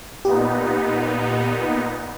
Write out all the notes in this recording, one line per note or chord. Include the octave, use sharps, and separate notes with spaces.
A#2 B3 D#4 G4